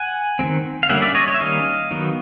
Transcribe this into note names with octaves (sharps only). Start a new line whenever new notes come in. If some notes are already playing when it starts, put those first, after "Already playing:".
Already playing: F#5 G#5
D#3 G#3 C4
F5
D3 G3 A#3 C#4 E5 F#5
D5 E5
C#5 D#5
C#5 D#5
E5
D#3 G3 A#3 C#4 D#5 F5
D#3 F#3 B3